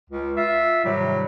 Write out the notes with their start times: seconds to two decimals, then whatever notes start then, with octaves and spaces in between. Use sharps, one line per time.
0.10 C#2
0.37 F4 E5
0.85 G#2 C3 D#3 F#3 G3